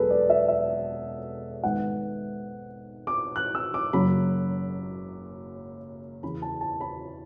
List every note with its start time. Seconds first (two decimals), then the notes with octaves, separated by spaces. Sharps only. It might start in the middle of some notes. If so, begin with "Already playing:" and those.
Already playing: E1 B2 F#3 B3 G#4 A4 B4
0.10 D5
0.30 E5
0.48 E5
1.63 G#1 G#2 G#3 B3 F#5
3.07 D6
3.36 F#6
3.55 E6
3.74 D6
3.93 F#1 F#2 C#3 F#3 B5
6.23 E2 C#3 E3 B5
6.42 A5
6.61 A5
6.81 B5